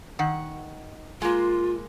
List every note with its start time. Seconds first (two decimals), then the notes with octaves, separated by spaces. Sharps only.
0.19 D#3 F#5
1.22 G#3 A#3 F4